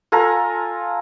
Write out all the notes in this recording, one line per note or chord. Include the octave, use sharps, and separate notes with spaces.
F4 A4 G#5 A#5